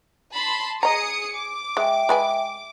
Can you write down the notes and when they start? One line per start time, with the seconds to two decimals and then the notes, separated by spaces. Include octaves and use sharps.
0.34 A5 B5 C6
0.83 G#4 D#5 A#5 D#6 C#7
1.36 D6
1.77 G#3 E5 G5
2.09 G#3 B4 G#5